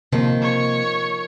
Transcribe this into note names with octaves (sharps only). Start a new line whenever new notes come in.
C3 D#3 F3 A#3
C#5